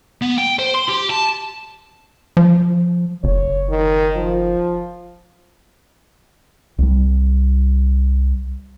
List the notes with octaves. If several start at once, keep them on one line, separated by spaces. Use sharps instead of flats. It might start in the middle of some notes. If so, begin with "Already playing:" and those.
B3
G5
C5
C6
G4
A5
F3
F#1 C#5
D#3
F3
C2 G3